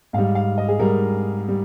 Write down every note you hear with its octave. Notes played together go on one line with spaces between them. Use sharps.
G#2 G3 F5
F5
D#5
G#4
G#2 G3 A#4
G3